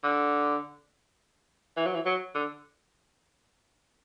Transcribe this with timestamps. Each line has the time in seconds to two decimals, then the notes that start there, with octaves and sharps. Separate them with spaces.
0.04 D3
1.77 E3
1.86 F#3
1.95 E3
2.05 F#3
2.35 D3